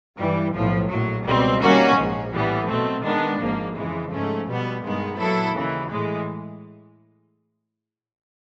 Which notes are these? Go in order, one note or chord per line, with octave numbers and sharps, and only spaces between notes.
G2 E3 G3
B1 A2 F3
A#1 A2 F#3
C#2 B2 G3 C4
D#3 G3 A#3 C#4 F#4
A#1 G#2 F3
A2 E3 G3 B3
B2 F#3 A3 C4
D#3 G#3 B3 D4
G#1 G#2 F3 A#3
F2 C#3 E3 G#3
G#2 F3 A3 C#4
B2 G3 B3
G2 D#3 G#3 B3
A#2 F#3 B3 E4 A4
D#2 C#3 E3
A2 E3 G#3